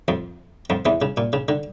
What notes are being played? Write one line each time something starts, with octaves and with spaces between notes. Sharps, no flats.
F2 F3
F2 F3
E2 E3
C#3
A#2
C#3
D3